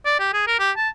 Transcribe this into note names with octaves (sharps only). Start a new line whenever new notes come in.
D5
G4
G#4
A#4
G4
A5